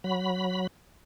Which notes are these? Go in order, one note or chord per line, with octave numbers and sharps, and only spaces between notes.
F#3 B5